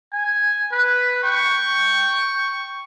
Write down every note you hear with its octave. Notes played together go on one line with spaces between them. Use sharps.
G#5
B4
G5 C#6